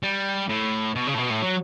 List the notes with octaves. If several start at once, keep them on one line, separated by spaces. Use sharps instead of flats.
G3
A2
B2
C#3
A2
B2
A2
F#3